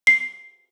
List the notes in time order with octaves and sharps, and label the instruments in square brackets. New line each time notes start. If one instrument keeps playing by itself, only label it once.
[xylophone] C7